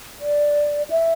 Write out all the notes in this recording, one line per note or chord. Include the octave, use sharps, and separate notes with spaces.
D5
E5